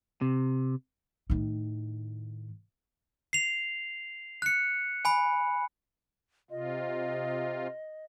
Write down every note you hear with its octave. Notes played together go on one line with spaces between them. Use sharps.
C3
A2 D#3
C7 F7
F#6 C#7
G#5 B5
C3 F4 D#5